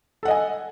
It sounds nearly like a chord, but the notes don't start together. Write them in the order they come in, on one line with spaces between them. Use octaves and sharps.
A4 F#5 D#5 G#5